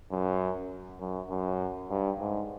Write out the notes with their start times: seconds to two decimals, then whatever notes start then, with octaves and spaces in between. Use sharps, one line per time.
0.11 F#2
1.00 F#2
1.30 F#2
1.90 G2
2.19 G#2